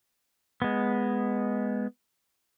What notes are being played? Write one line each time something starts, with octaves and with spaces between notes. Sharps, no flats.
G#3 B3